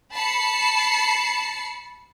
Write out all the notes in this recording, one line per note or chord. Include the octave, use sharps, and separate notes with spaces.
A5 B5 C7 C#7